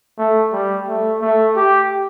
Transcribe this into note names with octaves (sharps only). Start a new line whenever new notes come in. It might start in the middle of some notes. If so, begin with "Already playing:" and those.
A3
G3
A3
A3
G4